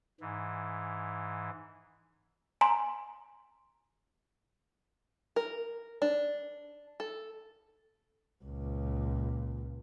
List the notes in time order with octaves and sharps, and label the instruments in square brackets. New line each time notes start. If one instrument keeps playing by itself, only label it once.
[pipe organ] G#2 E3
[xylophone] G#5 A#5 C6
[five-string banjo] A#4
D4
A4
[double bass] C#2 A#2